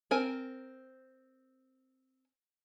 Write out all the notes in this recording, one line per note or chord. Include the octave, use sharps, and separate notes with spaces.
C4 A#4 G#5